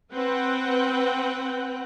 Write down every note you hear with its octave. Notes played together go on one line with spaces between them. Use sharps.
C4 B4 F#5 G5